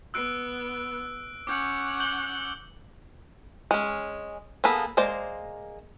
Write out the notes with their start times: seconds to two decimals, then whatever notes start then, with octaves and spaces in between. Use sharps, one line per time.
0.14 B3 E6 F#6 D7
1.47 C#4 F#5 D6 G6
2.00 G6 F#7 G7
3.71 G#3 C#4
4.64 A#3 B3 G#4 A4 B4
4.97 G#3 A#3 C5 D5